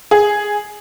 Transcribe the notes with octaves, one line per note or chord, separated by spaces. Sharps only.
G#4